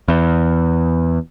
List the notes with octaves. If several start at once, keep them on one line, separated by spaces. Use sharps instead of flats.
E2